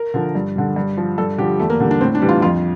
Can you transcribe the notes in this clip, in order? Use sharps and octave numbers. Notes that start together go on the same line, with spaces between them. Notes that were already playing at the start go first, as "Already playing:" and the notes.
Already playing: A#4
D3 F3
G2
D3 G3
G2
F3
G2 A4
D3 F3 G4
E2 A3
A#3
D3 G3
D4
A2 C4
D4
E3 G3
F4
F2 F4